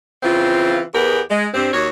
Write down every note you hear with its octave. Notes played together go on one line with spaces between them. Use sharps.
C#3 E3 C4 F4
E2 B3 G4 G#4 A#4
G#3
G2 C4
D#2 F#4 C#5